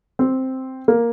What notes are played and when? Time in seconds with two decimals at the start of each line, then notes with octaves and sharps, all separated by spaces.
0.19 C4
0.88 A#3